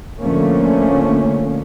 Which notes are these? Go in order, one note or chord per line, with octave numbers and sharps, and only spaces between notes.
D3 F3 A3 A#3 C#4